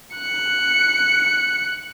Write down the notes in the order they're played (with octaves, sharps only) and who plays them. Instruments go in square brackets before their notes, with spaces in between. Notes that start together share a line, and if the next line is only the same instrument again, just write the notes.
[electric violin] F#6 C#7